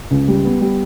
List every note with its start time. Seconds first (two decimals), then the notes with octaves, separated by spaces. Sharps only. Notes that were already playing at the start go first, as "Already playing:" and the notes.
0.11 C#2
0.28 G3
0.45 B3
0.61 G3